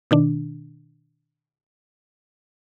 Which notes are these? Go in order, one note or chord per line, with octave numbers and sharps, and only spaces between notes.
B2 D#3 D4